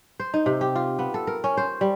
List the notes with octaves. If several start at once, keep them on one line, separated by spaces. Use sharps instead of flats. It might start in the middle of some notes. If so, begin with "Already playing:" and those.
C5
D#4
C3
G4
F4
B3
A4
A#4
C#4
C5
G3